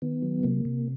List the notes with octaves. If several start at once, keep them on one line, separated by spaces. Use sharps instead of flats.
D#3 B3
F#3
C3 A#3
C3